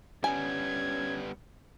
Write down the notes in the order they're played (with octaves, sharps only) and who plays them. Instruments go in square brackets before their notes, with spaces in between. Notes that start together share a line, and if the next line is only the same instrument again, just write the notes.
[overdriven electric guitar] G3 B3 [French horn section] C#4 [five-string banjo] G#5 [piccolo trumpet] G#6